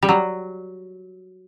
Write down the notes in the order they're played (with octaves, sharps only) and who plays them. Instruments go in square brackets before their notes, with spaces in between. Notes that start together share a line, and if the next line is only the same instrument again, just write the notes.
[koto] G3
F#3